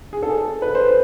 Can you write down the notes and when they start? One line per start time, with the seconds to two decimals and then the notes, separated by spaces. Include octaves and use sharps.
0.13 G#4
0.23 A4
0.62 B4
0.75 C5